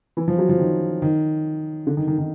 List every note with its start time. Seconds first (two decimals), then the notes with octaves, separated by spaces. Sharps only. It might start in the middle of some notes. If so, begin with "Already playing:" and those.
0.17 E3
0.28 F3
0.39 F#3
0.49 F3
0.60 D#3
1.02 D#3
1.87 D3
1.97 D#3
2.08 D#3
2.18 D#3